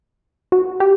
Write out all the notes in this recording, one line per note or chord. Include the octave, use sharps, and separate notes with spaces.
F#4
G4